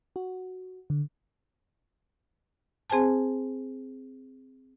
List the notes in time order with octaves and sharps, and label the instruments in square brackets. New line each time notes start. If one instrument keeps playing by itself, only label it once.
[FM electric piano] F#4
D3
[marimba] C4 G#4 C5 G#5 A5